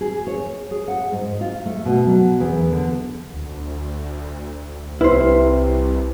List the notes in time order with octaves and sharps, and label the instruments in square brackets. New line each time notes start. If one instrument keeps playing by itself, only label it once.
[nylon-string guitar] G#4
C#5
G#4
F#5
G#2
F4
A3
B2
F#3
E2
D3
[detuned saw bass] D2
[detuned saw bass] C2 [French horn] C3 [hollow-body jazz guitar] E4 C5 [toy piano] B4